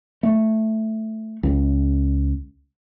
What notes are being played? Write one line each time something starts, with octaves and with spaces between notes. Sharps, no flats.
A3
C#2